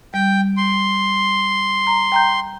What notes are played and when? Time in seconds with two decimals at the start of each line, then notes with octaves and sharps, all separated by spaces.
0.14 G3 G5
0.57 C6
1.87 A#5
2.12 G5 A#5 G6